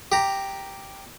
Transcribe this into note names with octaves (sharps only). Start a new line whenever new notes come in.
G4 A#5